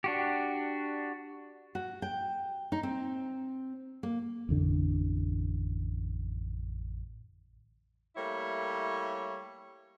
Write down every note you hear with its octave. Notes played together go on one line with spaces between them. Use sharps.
D4 F#4 G4
F#4
G5
D#4
C4
A#3
A1 F2 D3 D4
G3 A3 A#3 E4 C#5